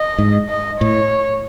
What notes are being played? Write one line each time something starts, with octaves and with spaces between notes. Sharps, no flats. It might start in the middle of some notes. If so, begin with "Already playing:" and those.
Already playing: D#5
G#2
D#5
A2 C#5